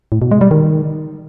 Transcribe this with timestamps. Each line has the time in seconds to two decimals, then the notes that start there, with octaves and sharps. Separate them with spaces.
0.12 A2
0.22 B2
0.31 G#3
0.41 G3
0.51 D#3